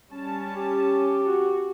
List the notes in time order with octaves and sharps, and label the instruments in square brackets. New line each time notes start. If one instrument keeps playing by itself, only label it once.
[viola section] G3 C#4 A5
[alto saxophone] G4
[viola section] F#4